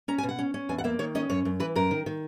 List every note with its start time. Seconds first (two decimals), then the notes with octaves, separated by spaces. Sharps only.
0.08 C#4 A#5
0.18 G#5
0.23 B2
0.29 F#5
0.38 C#4
0.54 C#4
0.69 E2 G#5
0.78 F#5
0.84 A#3 E5
0.99 D#3 C#5
1.15 C#4 D#5
1.29 F#2 C#5
1.45 F#2
1.60 E3 B4
1.75 F#2 A#4
1.91 D#3
2.06 D#3